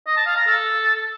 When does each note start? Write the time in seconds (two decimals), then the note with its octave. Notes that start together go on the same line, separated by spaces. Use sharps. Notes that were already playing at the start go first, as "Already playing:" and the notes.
0.07 D#5
0.17 A5
0.27 F5
0.37 A#5
0.47 A4